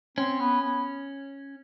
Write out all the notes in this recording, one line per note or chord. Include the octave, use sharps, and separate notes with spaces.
C4 C#4
B3
B3